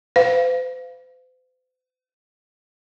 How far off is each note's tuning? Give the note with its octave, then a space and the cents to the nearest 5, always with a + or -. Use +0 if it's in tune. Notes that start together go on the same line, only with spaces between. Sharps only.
C5 -45 F5 -5